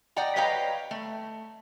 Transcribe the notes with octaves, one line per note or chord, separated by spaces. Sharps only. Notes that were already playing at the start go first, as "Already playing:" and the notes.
D5 D#5 F#5 G5 A#5
B4 C#5 D#5 F5 G5 A#5
A3